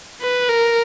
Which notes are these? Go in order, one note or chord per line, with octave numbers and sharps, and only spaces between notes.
B4
A#4